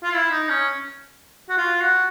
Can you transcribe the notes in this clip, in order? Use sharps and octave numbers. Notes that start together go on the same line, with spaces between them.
F4
E4
D#4
C#4
F#4
F4
F#4